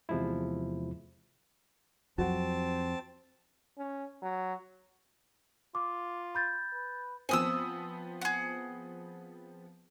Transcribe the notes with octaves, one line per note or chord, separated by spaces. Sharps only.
E2 C3 F3 G#3 E4
F2 F#3 C4 F#4 F#5 A5
C#4
F#3
F4 D6
B5 G6 A6
B4
F3 B3 C4 G#5 D#6 E6
G#4 F#5